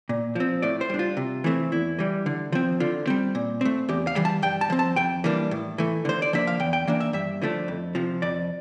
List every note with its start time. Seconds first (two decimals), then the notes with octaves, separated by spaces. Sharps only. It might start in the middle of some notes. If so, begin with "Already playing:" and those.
0.09 A#2
0.35 F3 C4
0.62 A2 D5
0.81 C5
0.90 G3 D4
0.99 F4
1.17 C3
1.44 E3 A3 C4
1.72 E2 E4
1.99 E3 G3
2.26 D3
2.52 F3 C4
2.80 D3 F4
3.07 G3 C4
3.35 A#2
3.61 A3 C4
3.89 E2 G4
4.07 F5
4.16 E3 G3
4.25 A5
4.42 G2 G5
4.61 A5
4.70 F3 C4
4.79 A5
4.96 F2 G5
5.24 E3 G3 A#3 D4
5.51 A2
5.78 E3 A3
6.05 D3 C5
6.22 D5
6.33 F3 A#3 D4 E5
6.47 F5
6.60 E2 G5
6.73 G5
6.87 E3 A#3 D4
7.00 E5
7.13 G2 E5
7.42 D3 F3 A3 D4
7.68 F2
7.95 C3 F3
8.22 F2 D5